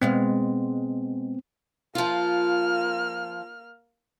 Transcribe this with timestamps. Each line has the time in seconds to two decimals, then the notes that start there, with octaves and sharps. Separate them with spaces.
0.01 B2 G#3 B3 C4 F5
1.95 F3 A#3 F4 F6